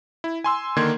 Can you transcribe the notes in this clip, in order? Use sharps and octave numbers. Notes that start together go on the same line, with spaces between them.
E4
G#5 C6 E6
D3 D#3 A#3 C6 G#6